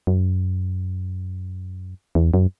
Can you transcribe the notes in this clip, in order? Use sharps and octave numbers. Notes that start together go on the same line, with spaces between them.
F#2
E2
F#2